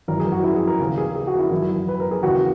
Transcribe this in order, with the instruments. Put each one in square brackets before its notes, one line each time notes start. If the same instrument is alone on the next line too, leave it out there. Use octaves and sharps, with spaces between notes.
[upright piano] G#1 F#2 E3 A#4
G#4
F#4
E4
G#4
A#4
D#2 C#3 E3 G#4
G#4
G#4
F#4
E4
G#1 F#2 E3 E4
B4
A#4
G#4
D#2 C#3 E3 F#4